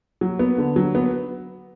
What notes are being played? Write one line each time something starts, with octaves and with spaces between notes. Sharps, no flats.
F#3
B3
D3
F#3
B3